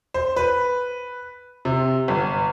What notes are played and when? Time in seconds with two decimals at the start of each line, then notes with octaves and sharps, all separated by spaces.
0.14 C5
0.36 B4
1.65 C3
2.08 G1